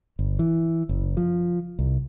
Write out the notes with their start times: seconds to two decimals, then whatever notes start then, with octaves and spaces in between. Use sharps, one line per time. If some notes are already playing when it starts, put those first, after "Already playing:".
0.19 G1
0.39 E3
0.89 F#1
1.17 F3
1.79 C2